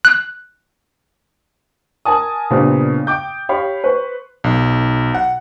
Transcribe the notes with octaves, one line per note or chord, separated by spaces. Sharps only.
F#6
A#4 G#5 A5 D#6
A#2 C#3 G3 B3 C4 D4
G5 D6 G6
G4 C#5 F5 B5
B4 C5 C#6
B1
F#5